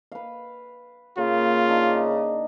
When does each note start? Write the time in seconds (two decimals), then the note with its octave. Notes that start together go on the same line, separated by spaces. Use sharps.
0.12 B4 F5
1.18 C#3 A#3 F4
1.69 D4 D#4